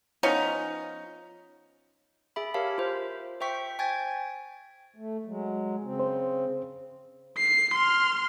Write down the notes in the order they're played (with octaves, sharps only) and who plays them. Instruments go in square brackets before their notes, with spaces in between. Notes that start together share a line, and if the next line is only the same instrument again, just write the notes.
[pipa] F3 B3 C#4 D#4
[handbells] G#4 E5 B5
G4 A#4 C#5 E5 F5 A5
F4 C5
C5 E5 G5 C#6 B6
G5 G#5 G#6 A6
[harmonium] A3
F#3 G#3
C#3 C4
[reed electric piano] C5
[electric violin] C7
C6 F6